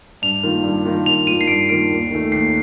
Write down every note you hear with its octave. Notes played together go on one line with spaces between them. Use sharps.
G2 F7
D#3 A#3 F4
G2
D#3 A#3 F4
G2 F7
D#3 A#3 F4 D#7
C7
G2 D7
D#3 A#3 F4 D7
D#2
D#3 A3
D#2 C7